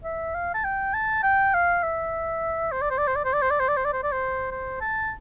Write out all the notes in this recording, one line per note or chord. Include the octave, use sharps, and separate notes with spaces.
E5
F5
A5
G5
A5
G5
F5
E5
C5
D5
C5
D5
C5
D5
C5
D5
C5
D5
C5
D5
C5
D5
C5
D5
C5
C5
A5